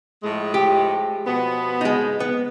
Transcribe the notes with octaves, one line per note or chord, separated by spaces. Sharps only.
A2 F3 G#3
G4
B2 F3 B3
G#3 D#4
B3